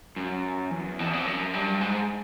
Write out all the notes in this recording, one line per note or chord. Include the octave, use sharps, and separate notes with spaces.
F#2
E2
F2
E2
F2
F#2
G2
G#2